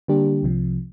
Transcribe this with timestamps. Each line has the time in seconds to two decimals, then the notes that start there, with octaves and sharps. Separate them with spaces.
0.08 D3 G3 A#3 D4 G4
0.43 C2 C3 F3